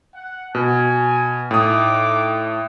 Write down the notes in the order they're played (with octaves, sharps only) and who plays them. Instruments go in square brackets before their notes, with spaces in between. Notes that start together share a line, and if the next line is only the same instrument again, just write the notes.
[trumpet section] F#5
[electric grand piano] B2 [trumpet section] G#5
[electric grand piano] A2 D#6 [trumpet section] D#4 D6